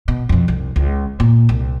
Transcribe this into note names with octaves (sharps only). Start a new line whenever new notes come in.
B2
F2 B2
C2
C#2
A#2
C2